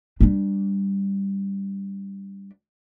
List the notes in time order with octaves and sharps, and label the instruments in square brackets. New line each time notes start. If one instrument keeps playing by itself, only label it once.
[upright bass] G3 D4